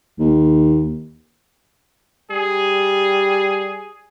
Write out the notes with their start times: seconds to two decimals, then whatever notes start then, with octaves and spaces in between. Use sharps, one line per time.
0.19 D#2
2.31 G3 G#4